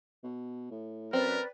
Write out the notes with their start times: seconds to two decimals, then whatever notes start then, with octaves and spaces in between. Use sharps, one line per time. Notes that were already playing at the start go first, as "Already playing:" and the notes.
0.24 B2
0.71 A2
1.13 F#2 C4 A#4 B4 D5